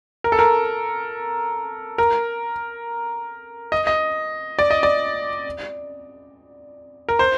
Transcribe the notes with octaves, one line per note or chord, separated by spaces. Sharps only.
A#4
A4
A#4
A#4
D#5
D#5
D5
D#5
D5
A#4
C5